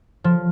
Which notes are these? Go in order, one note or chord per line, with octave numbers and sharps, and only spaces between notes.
F3